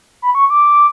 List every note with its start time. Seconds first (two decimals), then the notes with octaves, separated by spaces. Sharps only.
0.22 B5
0.35 C#6
0.50 D6